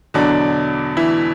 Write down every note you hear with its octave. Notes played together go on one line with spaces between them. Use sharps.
E2 B2 D3 F#3 D4
E3 E4